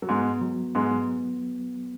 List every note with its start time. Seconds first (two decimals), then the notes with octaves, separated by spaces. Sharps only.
0.02 F#3
0.09 G#2 G#3 B3
0.42 F#3
0.75 G#2 G#3 B3